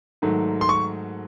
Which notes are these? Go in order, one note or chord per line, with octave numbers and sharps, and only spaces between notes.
G#2 D#3 F#3 A3
C6
C#6